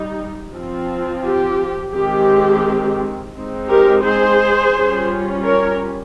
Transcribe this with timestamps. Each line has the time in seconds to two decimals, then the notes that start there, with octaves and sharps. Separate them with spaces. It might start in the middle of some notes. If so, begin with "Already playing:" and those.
Already playing: G3 D#4
0.54 F3 C4 F4
1.23 G4
1.93 D#3 G#3 C4 G4
3.34 G#3 C4 D#4
3.68 G4 A#4
4.04 G#4 C5
4.74 G3 C#4 F4
5.44 A#4 C#5